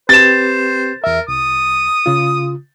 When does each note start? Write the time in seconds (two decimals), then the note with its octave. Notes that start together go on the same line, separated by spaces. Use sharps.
0.09 C4 G4 B4 C5 A6 E7
1.04 E2 A#4 E5
1.28 C2 D#6
2.06 C#3 F4